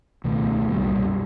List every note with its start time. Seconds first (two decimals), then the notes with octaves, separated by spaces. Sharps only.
0.24 C#2 B2 D#3 A3
0.68 C2 F#2 A#2 G3